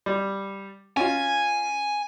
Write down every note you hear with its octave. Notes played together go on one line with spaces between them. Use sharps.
G3
C#4 F4 G#5